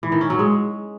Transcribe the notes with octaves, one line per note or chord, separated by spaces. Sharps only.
E3
D#3
C#4
F#3
G#3